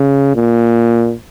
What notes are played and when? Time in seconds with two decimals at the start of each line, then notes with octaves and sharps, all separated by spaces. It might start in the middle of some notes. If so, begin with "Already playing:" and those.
Already playing: C#3
0.36 A#2